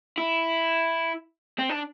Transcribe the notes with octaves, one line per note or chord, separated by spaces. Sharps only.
E4
C4
D4